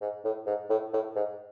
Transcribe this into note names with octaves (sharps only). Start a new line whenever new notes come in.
G#2
A2
G#2
A2
A2
G#2